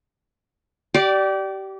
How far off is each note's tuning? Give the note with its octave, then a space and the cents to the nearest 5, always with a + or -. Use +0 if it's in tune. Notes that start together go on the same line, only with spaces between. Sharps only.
G4 -25 D5 +0